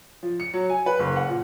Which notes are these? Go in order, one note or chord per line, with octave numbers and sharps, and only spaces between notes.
F3
C#7
F#3
G#5
B4
F#1
F#5
A#2